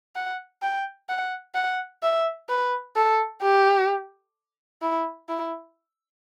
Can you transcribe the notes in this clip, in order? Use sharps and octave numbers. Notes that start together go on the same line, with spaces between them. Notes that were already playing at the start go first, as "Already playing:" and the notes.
F#5
G5
F#5
F#5
E5
B4
A4
G4
E4
E4